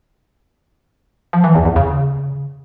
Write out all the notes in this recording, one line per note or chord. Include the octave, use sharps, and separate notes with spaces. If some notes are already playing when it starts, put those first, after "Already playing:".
F3
E3
E2
E2
C#3